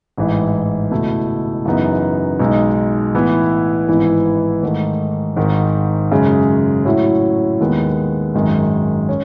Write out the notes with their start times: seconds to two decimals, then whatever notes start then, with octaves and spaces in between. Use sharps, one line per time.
0.18 A1 G#2 E3
0.91 C#2 B2 A3 E4
1.65 F#2 C#3 E3 B3 D#4
2.40 B1 B2 G#3 D#4
3.14 A2 E3 B3 E4
3.89 G#1 G#2 E3 B3 E4
4.63 G#2 D#3 A3
5.37 G#1 G#2 D#3
6.11 F#2 C#3 G#3
6.85 A2 F#3 C#4 E4
7.60 D#2 D#3 G#3 B3
8.35 G#1 F#2 D#3 G#3
9.09 C#4